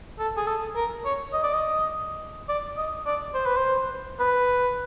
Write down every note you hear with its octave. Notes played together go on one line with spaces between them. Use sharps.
A4
G#4
A4
A#4
C#5
D#5
D5
D#5
D5
D#5
D5
C5
B4
C5
B4